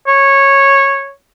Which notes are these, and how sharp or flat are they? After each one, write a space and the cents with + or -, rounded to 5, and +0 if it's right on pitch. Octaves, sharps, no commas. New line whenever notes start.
C#5 -10